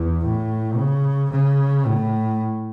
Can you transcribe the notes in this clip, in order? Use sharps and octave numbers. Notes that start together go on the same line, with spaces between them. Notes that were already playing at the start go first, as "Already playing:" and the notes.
Already playing: E2
A2
C#3
C#3
A2